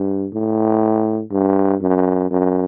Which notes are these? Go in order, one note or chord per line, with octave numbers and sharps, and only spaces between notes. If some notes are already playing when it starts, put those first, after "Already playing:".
Already playing: G2
A2
G2
F#2
F#2